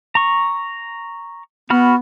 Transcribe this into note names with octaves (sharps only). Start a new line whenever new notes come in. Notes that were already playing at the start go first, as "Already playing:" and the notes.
A#5 C#6
B3 F#4 B5 F6